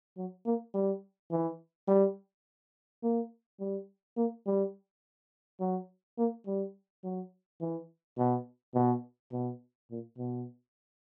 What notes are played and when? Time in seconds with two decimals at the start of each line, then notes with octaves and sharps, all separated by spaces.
0.17 F#3
0.46 A#3
0.74 G3
1.31 E3
1.88 G3
3.03 A#3
3.60 G3
4.17 A#3
4.46 G3
5.60 F#3
6.18 A#3
6.47 G3
7.04 F#3
7.61 E3
8.18 B2
8.75 B2
9.32 B2
9.90 A#2
10.18 B2